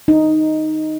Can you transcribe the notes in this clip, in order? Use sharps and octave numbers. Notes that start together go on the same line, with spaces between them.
D#4